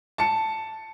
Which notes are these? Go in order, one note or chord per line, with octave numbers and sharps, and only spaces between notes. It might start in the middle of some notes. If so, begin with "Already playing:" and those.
A5 C#7